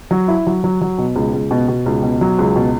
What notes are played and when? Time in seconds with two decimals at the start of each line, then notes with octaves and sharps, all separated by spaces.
0.11 F#3
0.28 E4
0.47 F#3
0.64 F#3
0.81 F#3
0.98 B2
1.16 C#2
1.34 C#2
1.51 B2
1.68 B2
1.86 C#2
2.03 B2
2.21 F#3
2.39 C#2
2.56 B2